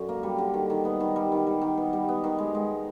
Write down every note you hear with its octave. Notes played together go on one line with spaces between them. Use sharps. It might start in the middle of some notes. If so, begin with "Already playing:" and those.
Already playing: F#2 D3
A#3
G3
D3
D#3
D#3
B3
D#3
G3
D#3
G3
D#3
B3
G3
B3
D#3
G#3
G#3